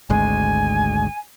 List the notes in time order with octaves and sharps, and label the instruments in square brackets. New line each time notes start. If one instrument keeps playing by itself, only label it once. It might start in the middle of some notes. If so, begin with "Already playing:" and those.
[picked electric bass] G#1 D2 G#3 [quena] G#5